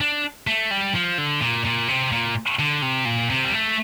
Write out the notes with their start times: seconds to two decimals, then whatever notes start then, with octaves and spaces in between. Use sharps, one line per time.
0.01 D4
0.47 A3
0.71 G3
0.95 F3
1.18 D3
1.41 A#2
1.65 A#2
1.88 C3
2.12 A#2
2.59 D3
2.82 C3
3.05 A#2
3.30 C3
3.45 G3
3.53 A3